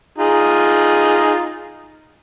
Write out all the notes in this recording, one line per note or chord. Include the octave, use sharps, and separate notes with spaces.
D#4 F4 G#4